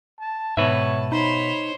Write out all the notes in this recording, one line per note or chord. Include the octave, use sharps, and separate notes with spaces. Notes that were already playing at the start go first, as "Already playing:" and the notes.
A5
G#2 B2 B4 C#5 E5 A5
D#4 C5 C#5 B5